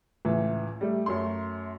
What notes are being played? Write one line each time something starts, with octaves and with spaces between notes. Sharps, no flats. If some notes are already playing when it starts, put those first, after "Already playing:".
C#2 A2 E3
G3 A3
F#2 A3 C#5 C6